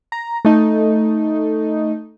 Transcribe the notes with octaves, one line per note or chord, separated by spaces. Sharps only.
A#5
A3 D#4